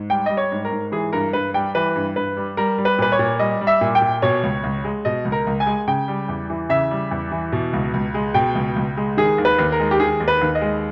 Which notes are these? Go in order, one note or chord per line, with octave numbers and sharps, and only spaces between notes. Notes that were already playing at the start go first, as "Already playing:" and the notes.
Already playing: G#2
G3 G5
G3 D#5
C#5
G#2
A#4
G#2
E3 G#4
G2 A#4
G2 B4
G3 G5
E3 B4
G2
G2 B4
G3
G3 A#4
G3
B4
A#2 B4
C#5
A#2
G3 D#5
G3
E5
A#2
G5
A#2
B2 C#5
C#2
C#2
G#3
B2 D#5
C#2
A#4
C#2
G#5
G#3
C#3 G5
G3
E2
E3
C#3 E5
G3
E2
E3
B2
C#2
C#2
G#3
B2 G5
C#2
C#2
G#3
D#3 G#4
D#2
B4
D#2
A#4
G#3
G4
D#3 G#4
D#2
B4
D#2
D#5
G#3